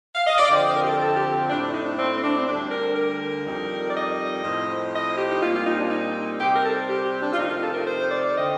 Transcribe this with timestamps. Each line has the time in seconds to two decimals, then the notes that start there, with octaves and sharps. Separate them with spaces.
0.15 F5
0.27 D#5
0.38 D5
0.50 F2 D3 F3 C4 C5
0.67 C5
0.75 A#4
0.82 G4
0.87 A4
1.00 A4
1.16 G4
1.48 A2 A3 C4 D4
1.61 D4
1.72 D#4
1.85 D4
1.97 C4
2.17 C4
2.22 D4
2.38 C4
2.46 D2 D3 G3 D4
2.71 A#4
2.95 A#4
3.44 F2 D#3 G3
3.88 D5
3.94 D#5
4.43 A2 F3 C4
4.92 D#5
5.16 G4
5.31 D#4
5.40 A#2 G3 C4 F4
5.53 F4
5.66 D#4
5.78 D4
5.90 D#4
6.38 C3 G3 C4 G4
6.54 A#4
6.64 A4
6.88 G4
7.05 G4
7.20 D4
7.32 F4
7.37 F2 C3 D#3 A3 C4 D#4
7.49 F4
7.62 A4
7.73 A#4
7.86 C5
8.11 D5
8.36 D3 A3 C4 D#5